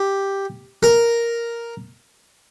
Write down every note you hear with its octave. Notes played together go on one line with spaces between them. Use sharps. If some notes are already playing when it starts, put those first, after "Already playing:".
Already playing: G4
A#4